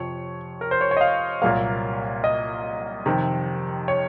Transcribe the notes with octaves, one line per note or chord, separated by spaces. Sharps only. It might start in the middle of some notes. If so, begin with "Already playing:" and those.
Already playing: F2 C3 F3 C#5
A#4
C5
C#5
C#5
D#5
F5
C2 A#2 F#3 A#3 F5
D#5
F2 C3 D#3
C#5